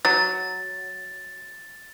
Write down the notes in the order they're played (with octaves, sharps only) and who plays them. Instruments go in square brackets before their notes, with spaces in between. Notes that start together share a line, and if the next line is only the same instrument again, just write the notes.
[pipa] F#3 [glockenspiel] A6